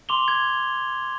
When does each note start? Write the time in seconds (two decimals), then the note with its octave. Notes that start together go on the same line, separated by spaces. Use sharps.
0.09 C6 D6 F7 G7
0.28 G#6